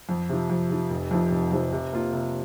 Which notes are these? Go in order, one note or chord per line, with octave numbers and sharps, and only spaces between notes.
F2
C3 F3
F2
C3 F3
F1
F2 C3 F3
F1
F2 C3 F3
C3
A#3 F4
C3